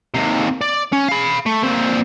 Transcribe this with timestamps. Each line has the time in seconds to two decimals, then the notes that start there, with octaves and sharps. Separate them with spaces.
0.15 D#2 C3
0.61 D5
0.93 C#4
1.08 F5 B5
1.46 A3
1.63 A#2 C4